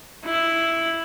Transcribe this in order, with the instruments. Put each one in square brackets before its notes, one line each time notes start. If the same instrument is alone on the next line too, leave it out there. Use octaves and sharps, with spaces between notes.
[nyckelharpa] E4